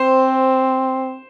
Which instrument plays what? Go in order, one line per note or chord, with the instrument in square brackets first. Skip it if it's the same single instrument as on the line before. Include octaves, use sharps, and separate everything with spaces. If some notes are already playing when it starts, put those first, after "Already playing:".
Already playing: [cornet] C4 [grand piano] C5 C6